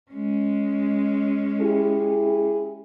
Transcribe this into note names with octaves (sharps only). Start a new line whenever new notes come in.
G#3 C#4
E4 G4 G#4